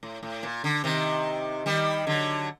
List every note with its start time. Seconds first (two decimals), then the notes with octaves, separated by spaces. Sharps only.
0.03 A2
0.23 A2
0.43 A#2
0.64 D3
0.84 C3 D#3
1.66 D#3 G3
2.07 D3 F#3